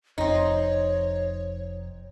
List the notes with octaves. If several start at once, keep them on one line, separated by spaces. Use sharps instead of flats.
F1 F2 C4 D#4 C#5